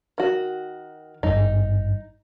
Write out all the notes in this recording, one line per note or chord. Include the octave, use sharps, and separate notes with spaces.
D#3 F#4
G#1 G2 D#4